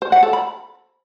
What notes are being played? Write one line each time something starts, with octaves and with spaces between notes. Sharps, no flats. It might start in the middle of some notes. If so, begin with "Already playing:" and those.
C5
F#5
A4
B5